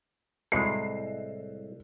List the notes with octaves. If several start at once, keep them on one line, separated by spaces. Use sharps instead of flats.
C2 A2 G#3 C7